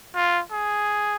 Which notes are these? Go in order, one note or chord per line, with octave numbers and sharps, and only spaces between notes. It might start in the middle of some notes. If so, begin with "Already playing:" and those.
F4
G#4